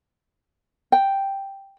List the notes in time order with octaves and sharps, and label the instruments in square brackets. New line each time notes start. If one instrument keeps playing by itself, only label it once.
[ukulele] G5